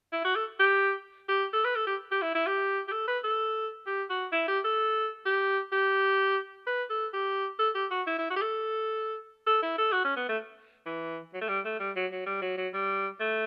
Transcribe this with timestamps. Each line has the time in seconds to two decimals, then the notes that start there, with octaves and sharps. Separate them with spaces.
0.12 E4
0.24 F#4
0.36 A4
0.60 G4
1.28 G4
1.53 A4
1.65 B4
1.75 A4
1.87 G4
2.11 G4
2.22 E4
2.35 E4
2.46 G4
2.88 G4
2.92 A4
3.08 B4
3.24 A4
3.87 G4
4.10 F#4
4.32 E4
4.48 G4
4.64 A4
5.26 G4
5.72 G4
6.67 B4
6.90 A4
7.13 G4
7.59 A4
7.75 G4
7.91 F#4
8.07 E4
8.18 E4
8.30 F#4
8.36 G4
8.42 A4
9.47 A4
9.63 E4
9.78 A4
9.93 F#4
10.04 C#4
10.16 B3
10.29 A3
10.86 E3
11.34 F#3
11.41 A3
11.48 G3
11.65 A3
11.80 G3
11.96 F#3
12.12 F#3
12.26 G3
12.42 F#3
12.57 F#3
12.74 G3
13.20 A3